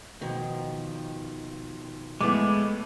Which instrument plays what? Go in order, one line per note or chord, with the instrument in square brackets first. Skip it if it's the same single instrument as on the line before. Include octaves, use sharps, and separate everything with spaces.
[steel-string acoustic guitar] B2 D#3 F3
[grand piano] A2 B3 [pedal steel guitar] G#3 A3 [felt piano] D6